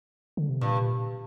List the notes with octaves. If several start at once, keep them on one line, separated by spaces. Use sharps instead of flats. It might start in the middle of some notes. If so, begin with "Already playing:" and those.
D3
C3
G2 A#2